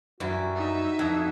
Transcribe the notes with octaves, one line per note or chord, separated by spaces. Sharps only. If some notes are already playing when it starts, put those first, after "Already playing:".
F#2 E3 G3 E4 F#4
D#4 E5
F2 E4 F#4